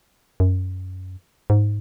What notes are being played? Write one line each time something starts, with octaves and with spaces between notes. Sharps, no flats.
F#2
G#2